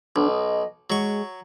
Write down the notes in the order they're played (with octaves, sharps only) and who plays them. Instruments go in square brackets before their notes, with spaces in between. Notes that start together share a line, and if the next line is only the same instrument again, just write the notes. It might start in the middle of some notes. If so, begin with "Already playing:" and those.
[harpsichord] B1 [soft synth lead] D4
[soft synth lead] D#5
[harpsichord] F#3 C#6 [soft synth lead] G#3